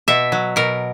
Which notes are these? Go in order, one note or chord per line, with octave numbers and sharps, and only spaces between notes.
B2 E5
F#3
B2 A#4